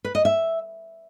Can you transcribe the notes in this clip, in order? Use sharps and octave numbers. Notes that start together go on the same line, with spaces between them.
B4
D#5
E5